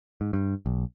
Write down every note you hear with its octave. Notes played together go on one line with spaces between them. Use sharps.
G#2
G2
B1